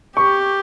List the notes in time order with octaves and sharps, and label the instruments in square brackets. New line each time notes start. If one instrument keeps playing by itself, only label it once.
[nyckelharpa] G4 [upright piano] C#6